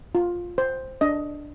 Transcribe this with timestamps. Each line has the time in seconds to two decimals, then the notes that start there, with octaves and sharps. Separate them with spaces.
0.15 F4
0.58 C5
1.01 D4 D#5